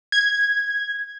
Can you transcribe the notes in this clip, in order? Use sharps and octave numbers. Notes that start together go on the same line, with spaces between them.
G#6